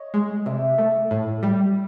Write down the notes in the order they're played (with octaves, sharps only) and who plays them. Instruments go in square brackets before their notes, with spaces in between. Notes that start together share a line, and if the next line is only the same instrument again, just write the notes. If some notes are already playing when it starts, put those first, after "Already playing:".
Already playing: [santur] C#5 D#5
[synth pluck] G#3
[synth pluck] C3 [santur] D5 E5
[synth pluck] A3
A2
G3